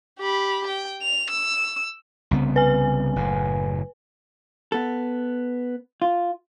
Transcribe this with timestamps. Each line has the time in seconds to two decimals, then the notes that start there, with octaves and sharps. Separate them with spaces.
0.19 G4 B5
0.67 G5
1.02 F7
1.30 E6
2.31 C2 C#3 B3
2.56 B4 G#5
3.16 F#1 A2
4.72 B3 A4
6.02 F4